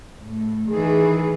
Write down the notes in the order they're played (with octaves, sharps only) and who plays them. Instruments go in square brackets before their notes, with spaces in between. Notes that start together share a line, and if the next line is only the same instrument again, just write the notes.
[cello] A2
[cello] D#3 E3 [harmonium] G#4